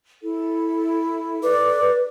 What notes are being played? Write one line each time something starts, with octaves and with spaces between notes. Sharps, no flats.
E4 A4
A4 B4 D5 D6